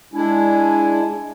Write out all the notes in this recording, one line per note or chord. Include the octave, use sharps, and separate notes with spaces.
G#3 D4 E4 G#5